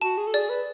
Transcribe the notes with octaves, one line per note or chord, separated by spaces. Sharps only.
F#4 A5
G#4
A4
G#4 D5
B4